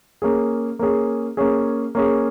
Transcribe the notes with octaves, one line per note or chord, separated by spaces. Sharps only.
A#3 C#4 G#4
A#3 C#4 G#4
A#3 C#4 G#4
A#3 C#4 G#4